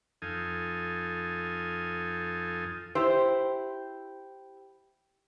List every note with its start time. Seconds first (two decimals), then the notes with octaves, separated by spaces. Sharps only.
0.22 F2 D#4 F4 A4 G#5 D#6
2.95 E4 G4 C5